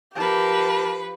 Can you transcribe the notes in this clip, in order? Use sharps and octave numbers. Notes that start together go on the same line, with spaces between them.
F3 G4 A#4 B4 A5